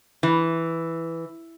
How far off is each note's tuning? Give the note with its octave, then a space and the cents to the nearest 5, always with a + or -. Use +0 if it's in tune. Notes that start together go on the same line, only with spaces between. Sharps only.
E3 +0